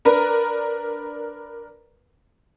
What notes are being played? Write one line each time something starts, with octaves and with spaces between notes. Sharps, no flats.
D4 A#4 B4